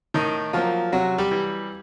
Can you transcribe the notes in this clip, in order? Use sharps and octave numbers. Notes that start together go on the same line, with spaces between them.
A2 D#3 D#4
F3 F#3 A#3 F4
C3 F#3 F#4
G3 G4
E3 G3